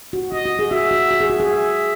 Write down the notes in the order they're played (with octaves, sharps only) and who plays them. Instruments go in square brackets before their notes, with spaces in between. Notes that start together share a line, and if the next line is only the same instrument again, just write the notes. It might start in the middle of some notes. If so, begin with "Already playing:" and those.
[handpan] F#4
[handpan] F#4 [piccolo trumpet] D#5
[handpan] F#4
G#4
[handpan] F#4 [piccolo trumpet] E5
[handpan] F#4
F#4
G#4
F#4
G#4
[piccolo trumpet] E5